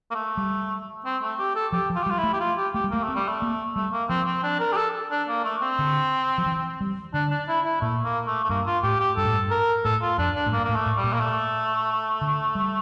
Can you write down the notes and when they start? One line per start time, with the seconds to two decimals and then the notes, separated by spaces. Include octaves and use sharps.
0.11 A#3
0.15 A3
0.37 G3
1.05 C4
1.22 A3
1.39 G4
1.55 A4
1.72 F3 G4
1.90 F3
1.96 F4
2.03 G4
2.06 G3
2.10 F4
2.18 E4
2.23 A3
2.33 G4
2.40 F4
2.57 G4
2.74 A3 G4
2.84 G3
2.91 A3 A#3
3.03 A3 C4
3.15 G3
3.28 A3
3.42 A#3
3.75 G3 A3
3.93 A#3
4.09 F3 C4
4.27 C4
4.43 D4
4.60 A#4
4.72 G4
4.77 A4
5.11 D4
5.28 A#3
5.44 A3
5.62 C4
5.79 D3
6.38 F3
6.46 E3
6.81 G3
7.14 D3 D4
7.31 D4
7.48 E4
7.65 E4
7.81 A#2 A3
8.04 A#3
8.27 A3
8.44 A3
8.49 G2 A#3
8.67 F4
8.83 A2 G4
8.99 G4
9.17 G2 A4
9.25 A2
9.33 G2
9.51 A#4
9.85 A2 A4
10.02 F4
10.18 F2 D4
10.36 D4
10.46 A2
10.52 G2 A#3
10.64 A2 A#3
10.75 A3
10.86 A2
10.97 G3
11.04 A#2
11.13 A#3
11.20 A3
12.21 D3
12.55 G3